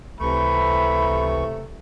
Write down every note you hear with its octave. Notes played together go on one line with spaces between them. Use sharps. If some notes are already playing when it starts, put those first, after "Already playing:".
C#2 C3 E3 A3 B5 C#6